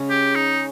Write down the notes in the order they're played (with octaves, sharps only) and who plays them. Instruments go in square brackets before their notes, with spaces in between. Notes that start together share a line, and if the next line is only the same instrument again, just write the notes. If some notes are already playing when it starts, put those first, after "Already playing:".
Already playing: [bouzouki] C#3 G#3 C#4
[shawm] G4
D#4